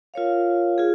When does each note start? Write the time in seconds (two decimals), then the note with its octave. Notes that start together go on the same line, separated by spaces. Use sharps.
0.14 F4 A#4 C#5 F5
0.78 F4 G#4